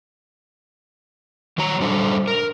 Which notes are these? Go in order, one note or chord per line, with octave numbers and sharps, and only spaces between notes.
D#3 F#3 C#5 A#5
G3 D4 A4 C5
A#4